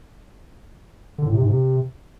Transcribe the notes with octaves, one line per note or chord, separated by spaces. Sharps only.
D3
A2
C3
G#2
C3